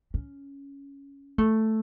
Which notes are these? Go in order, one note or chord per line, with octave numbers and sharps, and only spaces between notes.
C#4
A3